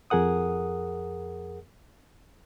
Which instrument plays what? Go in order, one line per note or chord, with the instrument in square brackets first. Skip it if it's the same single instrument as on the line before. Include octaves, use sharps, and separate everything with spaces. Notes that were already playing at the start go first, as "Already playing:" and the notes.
[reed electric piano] F2 G#4 A#4 F#5 D#6